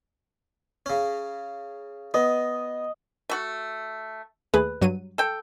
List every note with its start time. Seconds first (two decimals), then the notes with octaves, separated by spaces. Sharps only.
0.86 C#3 C#4
2.14 B3 D#5
3.29 A3 F#4
4.54 D#2 A3 G#4 B4
4.81 G2 F#3 D#7
5.18 A4 G5